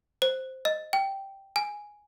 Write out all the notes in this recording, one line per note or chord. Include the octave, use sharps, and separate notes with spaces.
C5
D#5
G5
G#5